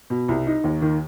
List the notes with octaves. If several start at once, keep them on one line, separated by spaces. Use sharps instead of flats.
B2
C2
D#4
D#2
D#3